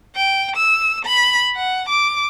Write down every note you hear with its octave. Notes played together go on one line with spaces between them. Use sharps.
G5
E6
B5
F#5
D6